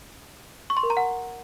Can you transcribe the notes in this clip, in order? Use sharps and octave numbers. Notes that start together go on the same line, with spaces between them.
C#6
C6
A#4
A#5
F#5